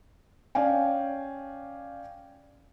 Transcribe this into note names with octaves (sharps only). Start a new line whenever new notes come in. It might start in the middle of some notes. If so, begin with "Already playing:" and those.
C#4 D5 F5 G5 G#5